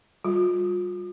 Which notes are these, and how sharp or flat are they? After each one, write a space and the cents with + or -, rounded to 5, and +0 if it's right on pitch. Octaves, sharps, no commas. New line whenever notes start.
G3 +0 F4 +40